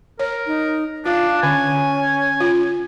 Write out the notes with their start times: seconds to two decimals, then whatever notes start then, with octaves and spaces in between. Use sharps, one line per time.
0.19 A#4 C#5
0.46 D#4
1.06 D4 F4 F5
1.43 D3 C#4 G#5
2.41 F4